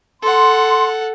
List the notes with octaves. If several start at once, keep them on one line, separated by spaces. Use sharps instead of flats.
A4 F#5 C6